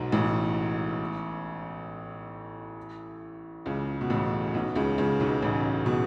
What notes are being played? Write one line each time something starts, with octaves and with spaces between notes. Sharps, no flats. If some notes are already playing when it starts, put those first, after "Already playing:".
Already playing: B1 G#2 B2
A1 A2
C#2 C#3
B2
A1 A2
B1 B2
C#2 C#3
C#2 C#3
B1 B2
A1 A2
B2